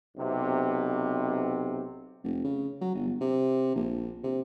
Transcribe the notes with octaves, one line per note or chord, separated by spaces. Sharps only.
B1 C3
F1
C#3
F#3
G1
C3
A#1
C3